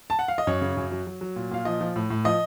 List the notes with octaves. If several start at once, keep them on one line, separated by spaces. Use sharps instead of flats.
A5
F#5
F5
D#5
F#2 C#5
C#3
F#2
F#3
F#3
F#3
A#2
A#2 F5
F3 D#5
F3
A2
A2
F3 D#5